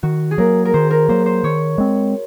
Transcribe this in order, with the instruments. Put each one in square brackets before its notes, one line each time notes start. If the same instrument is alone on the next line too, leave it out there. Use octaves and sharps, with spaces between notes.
[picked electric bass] D#3 [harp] F#4
[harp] G#4
[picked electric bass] F#3 A#3 [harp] A#4
[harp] A#4
[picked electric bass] D#3 [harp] C5
[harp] A#4
[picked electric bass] F#3 A#3 [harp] C5
[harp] C5
[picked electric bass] D#3 [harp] C#5
[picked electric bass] G#3 C4